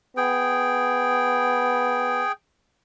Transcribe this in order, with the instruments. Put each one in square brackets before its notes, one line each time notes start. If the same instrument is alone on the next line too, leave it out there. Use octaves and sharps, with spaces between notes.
[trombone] B3 [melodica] G#4 G5